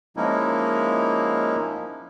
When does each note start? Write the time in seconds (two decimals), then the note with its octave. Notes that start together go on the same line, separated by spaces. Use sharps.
0.17 F3 G#3 A#3 C#4 D#4 E4